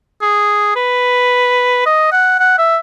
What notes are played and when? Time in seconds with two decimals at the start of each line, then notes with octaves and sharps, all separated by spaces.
0.22 G#4
0.76 B4
1.86 D#5
2.12 F#5
2.40 F#5
2.58 E5